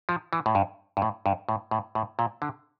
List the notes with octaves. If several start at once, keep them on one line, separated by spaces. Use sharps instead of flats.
F3
E3
A2
G2
G2
A2
G2
A2
A2
A2
A#2
D3